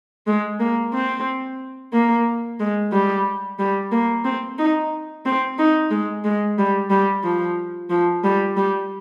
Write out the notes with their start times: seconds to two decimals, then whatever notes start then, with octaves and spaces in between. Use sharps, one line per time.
0.27 G#3
0.60 A#3
0.93 C4
1.93 A#3
2.60 G#3
2.92 G3
3.59 G3
3.92 A#3
4.25 C4
4.59 D#4
5.25 C4
5.58 D#4
5.91 G#3
6.24 G#3
6.58 G3
6.90 G3
7.23 F3
7.90 F3
8.24 G3
8.56 G3